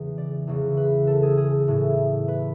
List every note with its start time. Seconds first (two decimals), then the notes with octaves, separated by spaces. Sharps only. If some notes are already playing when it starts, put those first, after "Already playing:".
Already playing: E2 C#3 E3
0.18 D5
0.47 E2 C#3 E3
0.77 B4
1.07 A4
1.23 G#4
1.38 G#4
1.68 A2 E3
2.28 B4